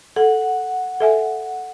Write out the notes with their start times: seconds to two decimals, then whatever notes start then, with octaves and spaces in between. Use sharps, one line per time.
0.16 A4 F#5
1.00 A4 E5 G#5